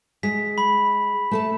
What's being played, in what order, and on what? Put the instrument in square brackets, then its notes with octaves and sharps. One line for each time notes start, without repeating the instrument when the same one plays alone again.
[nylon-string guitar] G#3 [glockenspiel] B6
[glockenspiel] B5
[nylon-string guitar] A3 A4 A5